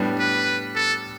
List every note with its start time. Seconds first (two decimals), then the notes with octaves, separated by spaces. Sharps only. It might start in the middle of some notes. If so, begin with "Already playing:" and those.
Already playing: A2 G3 B3 D4
0.19 B4
0.75 A4